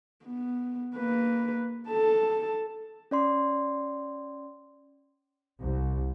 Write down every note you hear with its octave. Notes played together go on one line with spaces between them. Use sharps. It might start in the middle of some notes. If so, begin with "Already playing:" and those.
B3
A#3 B4
A4 A5
C#4 D5 C6
C2